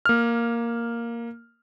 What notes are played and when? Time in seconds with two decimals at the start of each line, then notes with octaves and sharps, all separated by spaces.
0.05 A#3 F6